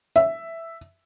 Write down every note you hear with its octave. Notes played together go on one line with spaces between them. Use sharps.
E5